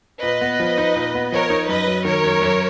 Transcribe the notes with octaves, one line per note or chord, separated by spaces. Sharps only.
A#2 B4 D#5
B3
F3
D#4
A#2
B3
F3 A#4 C#5
D#4
F#2 B4 D#5
F#3
D#3 A#4 C#5
F#2
F#2